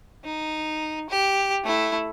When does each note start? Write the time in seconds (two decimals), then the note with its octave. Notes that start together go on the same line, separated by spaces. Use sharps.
0.24 D#4
1.10 G4
1.65 A3 E4